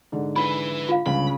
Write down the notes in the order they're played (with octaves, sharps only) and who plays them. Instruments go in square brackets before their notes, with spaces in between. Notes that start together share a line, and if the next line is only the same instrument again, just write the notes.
[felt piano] G#2 D3
[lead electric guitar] E4 B4 [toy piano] B5
[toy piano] F4 F5
[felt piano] G1 C#2 [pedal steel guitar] C#3 [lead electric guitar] B5